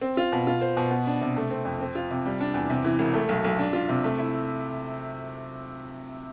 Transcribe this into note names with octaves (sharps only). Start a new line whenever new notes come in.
C4
F4
B2
F4
C5
B2
B3
D4
C3
A3
C4
F2
C4
F4
C3
G3
D4
E2
C3
E3
E1
A3
B1
B1
D4
F4
C3
A3
E4